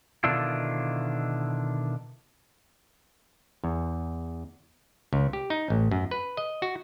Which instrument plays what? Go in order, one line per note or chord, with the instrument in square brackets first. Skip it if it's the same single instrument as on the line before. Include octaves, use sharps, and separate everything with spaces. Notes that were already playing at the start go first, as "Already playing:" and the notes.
[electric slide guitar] B2 D3 D#3 D4 E4 F4
[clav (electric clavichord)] E2
C#2
G4
D#4
A1
F#2
B4
D#5
F#4